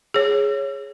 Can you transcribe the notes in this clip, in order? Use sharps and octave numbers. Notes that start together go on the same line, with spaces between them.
G#4 C#5